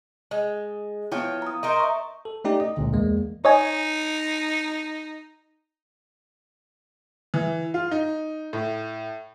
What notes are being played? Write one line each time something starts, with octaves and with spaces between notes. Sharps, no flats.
G#3 D#5
F3 B3 E4 C#5 G5
A#5 D#6
D#4 A#4 C5 D#5
E5 C#6
A4
A3 C#4 D#4 G4 D5
D#5
C#2 A#2 D3
E2 G#3 A#3
D#4 C#5 D#5 G#5
E3
F4
D#4
A2